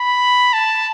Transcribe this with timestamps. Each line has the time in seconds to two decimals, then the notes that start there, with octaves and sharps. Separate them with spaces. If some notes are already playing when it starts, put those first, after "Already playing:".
Already playing: B5
0.53 A5